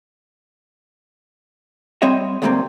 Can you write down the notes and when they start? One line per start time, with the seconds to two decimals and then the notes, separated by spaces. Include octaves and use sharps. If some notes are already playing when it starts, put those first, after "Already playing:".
2.02 G3 C4 C#5 D#5 E5
2.42 D2 G#2 C3 G3 A#3 C4